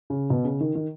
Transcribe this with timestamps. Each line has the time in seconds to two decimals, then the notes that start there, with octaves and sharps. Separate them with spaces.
0.10 C#3
0.30 B2
0.45 C#3
0.60 D#3
0.75 D#3